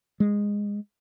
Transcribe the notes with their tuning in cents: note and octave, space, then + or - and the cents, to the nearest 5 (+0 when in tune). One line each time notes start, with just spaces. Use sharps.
G#3 -15